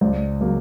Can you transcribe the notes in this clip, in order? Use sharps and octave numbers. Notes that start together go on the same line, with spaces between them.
C#2 C5 D5
C#3 F#3 A#3